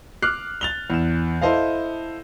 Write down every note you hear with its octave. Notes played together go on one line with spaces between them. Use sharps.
D6 F6 F#6 C7
A6 F7 G7
E2 E7
E4 A4 C5 D#5 F5